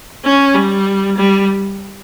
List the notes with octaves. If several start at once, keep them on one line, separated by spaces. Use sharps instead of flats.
C#4
G3
G3